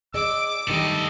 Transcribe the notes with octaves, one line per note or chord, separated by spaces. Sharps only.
G#4 D5 D#5 D6 E6 D7
G2 D#3 G3 A3 A4 D#5